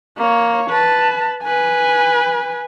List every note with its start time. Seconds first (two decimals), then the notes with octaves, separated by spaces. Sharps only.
0.18 A#3 C#5
0.71 B4 A5
1.43 B4 G#5